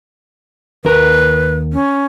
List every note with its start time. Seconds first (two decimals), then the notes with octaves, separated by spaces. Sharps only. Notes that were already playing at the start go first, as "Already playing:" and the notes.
0.85 D#2 A#4 B4
1.73 C#4